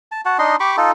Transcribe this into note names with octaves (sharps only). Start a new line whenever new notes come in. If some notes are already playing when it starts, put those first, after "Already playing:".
A5
F#4 F#5 A5
D4 D#4 D#5 C6
G4 B5 C#6 D6
D#4 F4 A4